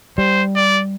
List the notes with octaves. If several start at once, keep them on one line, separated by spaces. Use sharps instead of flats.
G3 C5
D5